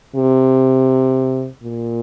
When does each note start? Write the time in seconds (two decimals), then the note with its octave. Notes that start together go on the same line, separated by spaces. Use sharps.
0.15 C3
1.63 A#2